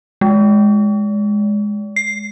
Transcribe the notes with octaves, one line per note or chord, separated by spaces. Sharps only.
G#3
C7